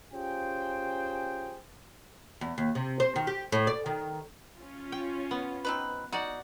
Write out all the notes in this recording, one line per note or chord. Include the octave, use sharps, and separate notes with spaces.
C#4 F4 G4 G#4 C5 G5
E2
D#2
C3
C5
D#3
G4
A2
D5
D#3
C#4 F4
G5
B3
C4 D#4 B4
D#4 F#4 D5 F#5